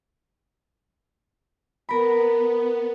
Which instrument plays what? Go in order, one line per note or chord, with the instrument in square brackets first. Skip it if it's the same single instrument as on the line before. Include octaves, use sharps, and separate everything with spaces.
[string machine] B3 [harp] A#4 B5